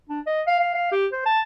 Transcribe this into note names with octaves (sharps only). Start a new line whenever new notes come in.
D4
D#5
F5
F5
F5
G4
C5
A5